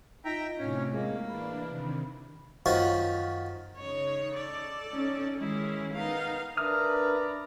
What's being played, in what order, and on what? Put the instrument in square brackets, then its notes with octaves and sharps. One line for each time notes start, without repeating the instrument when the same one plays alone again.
[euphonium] D#4 [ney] F4 [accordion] E5 G5 A#5
[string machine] A2 C3 [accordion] C#4
[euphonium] G#3 [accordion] A#3
[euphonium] E3 [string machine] D4 [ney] B5
[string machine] C3 D#3
[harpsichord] F#2 D#3 F3 F#4
[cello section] C#3 D#4 [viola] C#5
[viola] A4 D5
[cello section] C#4 D#4
[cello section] D#3 G#3 G#4 [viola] C#4 E4
[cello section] B3 A#4 [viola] D#4 F5
[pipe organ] D4 A#4 E5 [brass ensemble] B4 D5 A#5 [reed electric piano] D#6 F6